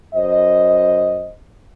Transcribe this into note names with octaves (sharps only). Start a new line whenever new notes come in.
F#2 C5 D#5